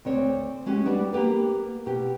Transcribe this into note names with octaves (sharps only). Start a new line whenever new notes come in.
D2 C4 C#5
G#3 C#4 F#4 G4
G3 B3 D4 F#4
A#3 B3 G4 B4
B2 G4